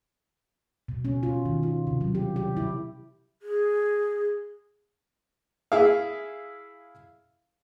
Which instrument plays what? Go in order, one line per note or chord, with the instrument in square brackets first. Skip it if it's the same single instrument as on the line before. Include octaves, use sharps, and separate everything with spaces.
[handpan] B2
C#4
F4
D#3
F4
C3
F#3
G4
G4
E4
[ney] G#4
[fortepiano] E4 G#4 E5 F5